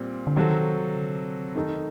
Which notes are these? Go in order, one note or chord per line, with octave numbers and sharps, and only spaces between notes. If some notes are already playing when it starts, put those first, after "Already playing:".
Already playing: A#2 G3 C4
D3
C3 D#3 F#3 C4 F#4 A4
D3
D#3 A3 D#4 A4